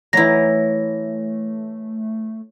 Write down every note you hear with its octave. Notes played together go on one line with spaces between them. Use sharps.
E3 F#3 A3 E4 A#5 A#6